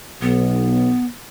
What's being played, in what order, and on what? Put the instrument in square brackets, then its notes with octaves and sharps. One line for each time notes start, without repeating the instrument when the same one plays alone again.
[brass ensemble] B1 [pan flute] B3